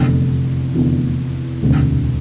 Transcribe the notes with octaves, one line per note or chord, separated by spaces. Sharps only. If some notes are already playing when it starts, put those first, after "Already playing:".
Already playing: F1 E2 D3
F1 E2 D3
E1 D2 C3